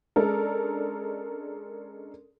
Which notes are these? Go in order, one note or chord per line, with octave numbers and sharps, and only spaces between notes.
G#3 C#4 D4 A4 A#4